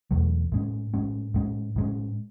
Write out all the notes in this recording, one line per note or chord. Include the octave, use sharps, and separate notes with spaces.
E2 B2 F#3 A3
A2 G#3 C#4
A2 G#3 C#4
A2 G#3 C#4
A2 G#3 C#4